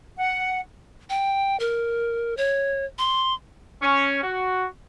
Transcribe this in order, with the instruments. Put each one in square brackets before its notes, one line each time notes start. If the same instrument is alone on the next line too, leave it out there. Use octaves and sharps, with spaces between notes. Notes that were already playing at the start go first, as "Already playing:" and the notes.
[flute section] F#5
[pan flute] G5
A#4
C#5
C6
[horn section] C#4
F#4